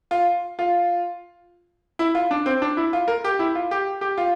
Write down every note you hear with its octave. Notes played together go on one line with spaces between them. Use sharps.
F4
F4
E4
F4
D4
C4
D4
E4
F4
A#4
G4
E4
F4
G4
G4
F4